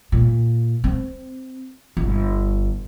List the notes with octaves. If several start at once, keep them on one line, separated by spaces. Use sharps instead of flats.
A#2
C4
G1